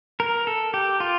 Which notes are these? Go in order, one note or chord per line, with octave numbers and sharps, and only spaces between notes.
A#4
A4
G4
F4